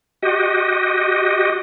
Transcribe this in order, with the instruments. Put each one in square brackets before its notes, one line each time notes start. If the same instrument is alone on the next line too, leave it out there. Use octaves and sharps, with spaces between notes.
[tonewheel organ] F#4 G4 D#5